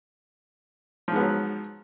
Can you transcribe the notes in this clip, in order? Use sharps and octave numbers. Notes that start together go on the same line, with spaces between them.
G#2 F3 F#3 B3